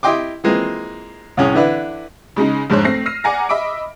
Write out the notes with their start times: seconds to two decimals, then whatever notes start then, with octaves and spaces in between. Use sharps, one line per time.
0.03 E4 G4 D#5 G5 C6 D6
0.44 E3 F3 G#3 A#3 C4
1.37 C2 A2 C#4 G#4
1.54 D3 E3 D4 E4 B4
2.36 C#3 G#3 C#4 D#4
2.70 F1 G#2 G#3 D4 C5 C#5
2.85 A3 C4 A#6 C7
3.06 E6 F6 A#6 C7 D#7
3.24 D5 F#5 G#5 A#5 A#6
3.49 D#5 E5 B5 D6 D7